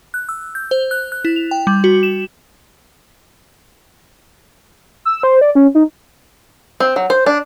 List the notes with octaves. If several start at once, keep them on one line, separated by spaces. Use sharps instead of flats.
F#6
E6
G6
C5
F#6
F#6
E4
F7
G5
G3
F#4
E7
E6
C5
D5
C#4
D#4
C4
F#3
C5
D4